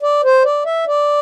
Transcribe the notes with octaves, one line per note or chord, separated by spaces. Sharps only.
D5
C5
D5
E5
D5